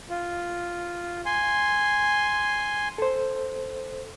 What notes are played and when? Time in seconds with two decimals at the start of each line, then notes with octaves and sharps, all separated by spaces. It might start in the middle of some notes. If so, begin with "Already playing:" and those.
0.09 F4
1.26 G#5 C6
2.98 A4 C5